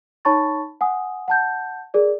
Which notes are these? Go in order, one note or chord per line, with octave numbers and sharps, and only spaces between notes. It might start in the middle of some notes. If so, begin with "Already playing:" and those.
D#4 C#5 A5 B5 C#6 A6
F#5 G#5 D#6
F#5 A5 G6
G#4 A#4 D5